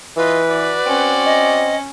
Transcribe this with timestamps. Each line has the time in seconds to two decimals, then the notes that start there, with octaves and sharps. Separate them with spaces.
0.17 E3 F4 B4 D#5
0.48 F#4 D5
0.86 C4 C#4
1.25 D#5